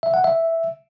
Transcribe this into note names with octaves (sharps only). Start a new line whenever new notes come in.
E5
F#5
E5